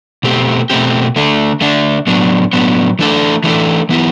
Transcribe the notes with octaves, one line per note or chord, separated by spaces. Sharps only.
B2 A3 C4 G4
B2 A3 C4 G4
D3 A3 D4
D3 A3 D4
A2 F#3 B3 D4
A2 F#3 B3 D4
E3 A3 D4 A4
E3 A3 D4 A4
E3 B3 E4 G4